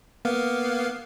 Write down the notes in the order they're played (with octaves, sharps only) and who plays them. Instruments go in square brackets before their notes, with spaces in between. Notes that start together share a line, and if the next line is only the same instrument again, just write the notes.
[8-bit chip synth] A#3 B3 F5